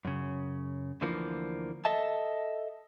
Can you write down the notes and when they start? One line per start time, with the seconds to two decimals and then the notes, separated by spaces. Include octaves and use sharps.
0.05 F#2 C#3
1.01 D2 D3 E3 F3 A#3
1.85 A4 D#5 E5 A5